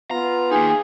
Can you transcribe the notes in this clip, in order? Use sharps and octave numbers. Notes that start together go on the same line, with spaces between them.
B3 F4 A#5
A#3 D#4 G#4